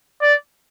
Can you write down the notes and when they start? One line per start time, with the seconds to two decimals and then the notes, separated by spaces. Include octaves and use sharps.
0.22 D5